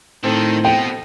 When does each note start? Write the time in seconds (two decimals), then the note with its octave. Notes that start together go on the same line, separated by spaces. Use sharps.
0.24 A2 D#3 C4 A4
0.64 B2 G5